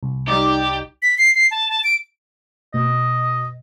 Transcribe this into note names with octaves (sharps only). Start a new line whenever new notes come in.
C2
G3 D#4 G4 D5
B6
C7
C7
A5
A5
D7
B2 D#5